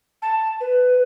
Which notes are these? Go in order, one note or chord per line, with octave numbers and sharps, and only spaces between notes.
A5
B4